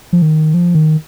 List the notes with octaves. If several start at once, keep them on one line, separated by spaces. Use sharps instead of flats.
F3
D#3
F3
D#3